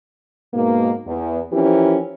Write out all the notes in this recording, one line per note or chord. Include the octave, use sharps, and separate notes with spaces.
G#2 B2 A#3
E2
E3 F3 C#4 E4 G4 A#4